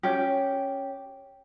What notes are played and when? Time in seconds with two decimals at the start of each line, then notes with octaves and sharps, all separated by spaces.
0.03 C#4 G4